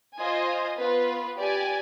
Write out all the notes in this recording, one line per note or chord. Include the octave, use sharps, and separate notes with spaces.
F4 C5 D#5 G#5
B3 F4 B4
G4 D5 G#5